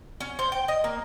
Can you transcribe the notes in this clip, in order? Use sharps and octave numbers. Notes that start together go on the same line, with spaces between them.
C#4
C5
G5
D#5
A#3